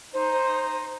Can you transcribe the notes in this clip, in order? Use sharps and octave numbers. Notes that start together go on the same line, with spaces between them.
D#4 C5